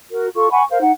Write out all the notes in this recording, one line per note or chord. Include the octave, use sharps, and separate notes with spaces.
F#4 A#4
F4 A4 C#6
F#5 G#5 B5 C#6
A#4 C5 F5
D#4 F#5